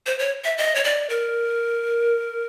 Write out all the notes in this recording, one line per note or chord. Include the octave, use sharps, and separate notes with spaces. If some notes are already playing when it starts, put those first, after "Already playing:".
C5
C#5
E5
D#5
C#5
D5
A#4